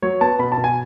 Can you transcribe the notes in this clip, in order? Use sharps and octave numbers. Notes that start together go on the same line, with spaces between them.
F#3 C#5
B3 A5
B2 B5
A5
B2
G#5